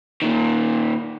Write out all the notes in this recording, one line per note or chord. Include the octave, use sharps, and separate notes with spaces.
A#2 D#3